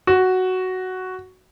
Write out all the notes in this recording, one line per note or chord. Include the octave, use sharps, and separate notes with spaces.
F#4